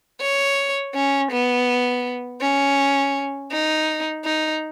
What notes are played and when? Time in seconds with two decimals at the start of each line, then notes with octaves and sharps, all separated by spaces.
0.21 C#5
0.95 C#4
1.32 B3
2.41 C#4
3.52 D#4
4.25 D#4